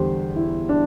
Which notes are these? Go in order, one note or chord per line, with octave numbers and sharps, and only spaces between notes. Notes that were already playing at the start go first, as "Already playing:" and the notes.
Already playing: E2 D3 G3 G4 C5
E4
D4